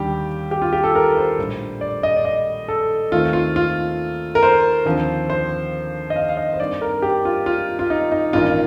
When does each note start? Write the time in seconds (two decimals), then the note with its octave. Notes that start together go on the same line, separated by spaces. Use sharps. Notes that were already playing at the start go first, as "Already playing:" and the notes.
Already playing: D#2 D3 G3 G4
0.51 G4
0.62 F4
0.73 G4
0.84 A4
0.95 A#4
1.17 C5
1.38 A#1 A2 G3
1.81 D5
2.03 D#5
2.16 D5
2.25 D#5
2.68 A4
3.12 D#2 D#3 A3 C4 F4
3.33 F4
3.56 F4
4.35 A#4
4.43 C5
4.85 D#2 D3 F3 C4
5.30 C5
6.10 D#5
6.16 F5
6.29 F5
6.37 D#5
6.54 C5
6.59 G2 D#3 G3 C4 D5
6.81 A#4
7.02 G4
7.25 F4
7.46 F4
7.79 F4
7.90 D#4
8.12 D#4
8.33 A1 G2 D#3 A#3 F4